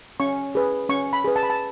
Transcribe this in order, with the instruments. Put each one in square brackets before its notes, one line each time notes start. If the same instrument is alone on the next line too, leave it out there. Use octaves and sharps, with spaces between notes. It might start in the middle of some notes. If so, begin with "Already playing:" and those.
[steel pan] C#4 C#6
G#4 B4
C#4 C#6
B5
G#4 B4
A5
B5
A5